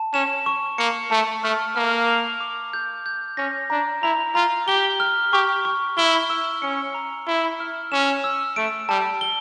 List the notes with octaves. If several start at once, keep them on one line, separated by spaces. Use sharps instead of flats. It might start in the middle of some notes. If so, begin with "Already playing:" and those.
Already playing: A5
C#4 E7
C#6
A#3 C#7
A3 A5
A3 F6
A#3 F6
F7
D6
G6
G6
C#4 A#6
D4 A#5
E4 A#5
F4 A#5
G4 G7
F6
G4 C#6
C#6
E4 G7
E6
C#4 C#7
A#5
E4 G7
F6
C#4 E7
E6
A3 D7
G3 A5
G7